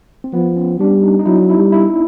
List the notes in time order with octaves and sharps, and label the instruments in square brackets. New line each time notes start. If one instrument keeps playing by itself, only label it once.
[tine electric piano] C4
[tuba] F3 [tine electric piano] B3
[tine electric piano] C#4
[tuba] G3 [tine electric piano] D4
[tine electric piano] D#4
D#4
[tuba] F#3 [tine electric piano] E4
[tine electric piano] E4
[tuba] G3
[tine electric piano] E4